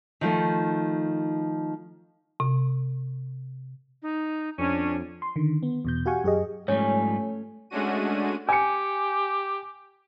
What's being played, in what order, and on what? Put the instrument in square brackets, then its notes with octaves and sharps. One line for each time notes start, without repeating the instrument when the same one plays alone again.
[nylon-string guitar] D#3 F3 A3 D#4
[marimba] C3
[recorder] D#4
[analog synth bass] F2 [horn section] C#4 [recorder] D4
[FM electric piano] C6
D3 D#3
B3
E2 B2 G6
F#4 G4 F5 F#5 G#5 C#6
F#2 G4 G#4 D#5
[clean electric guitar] G#2 F3 G3 [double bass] A3 [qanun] C#4 [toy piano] C#5
[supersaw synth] G#3 A3 C#4 D4 F#4 D#7
[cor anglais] G4 [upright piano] G#5 C#7